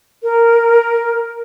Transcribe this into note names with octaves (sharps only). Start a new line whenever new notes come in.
A#4